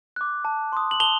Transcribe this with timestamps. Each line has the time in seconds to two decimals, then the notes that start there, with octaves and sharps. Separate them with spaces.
0.16 D6 F#6
0.45 A5
0.73 C6 D#6
0.91 F#7
1.00 A5 F7 G7